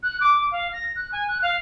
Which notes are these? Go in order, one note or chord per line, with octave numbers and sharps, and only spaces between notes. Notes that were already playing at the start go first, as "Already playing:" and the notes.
F#6
D6
F5
A#6
F#6
G#5
F#6
F5